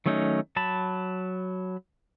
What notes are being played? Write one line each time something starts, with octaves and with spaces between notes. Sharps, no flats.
D#3 F#3 A3 C#4 D#4
F#3 A5 B5